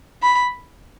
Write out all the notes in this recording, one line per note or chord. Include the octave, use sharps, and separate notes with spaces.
B5